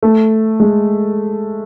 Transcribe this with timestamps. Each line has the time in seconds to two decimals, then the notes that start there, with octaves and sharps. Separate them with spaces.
0.03 A3
0.60 G#3